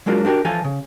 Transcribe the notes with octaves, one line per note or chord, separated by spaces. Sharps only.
F#3 G#3 A#3 D4 F4 F#4
D4 F#4 G4 A#4
E3 F3 F4 A4 G#5
C#3